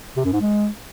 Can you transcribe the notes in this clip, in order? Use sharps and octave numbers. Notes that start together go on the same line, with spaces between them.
C3
F#2
G#2
G#3